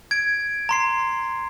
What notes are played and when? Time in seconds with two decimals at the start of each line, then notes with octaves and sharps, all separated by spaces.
0.11 G#6 D7
0.69 A#5 C6 C7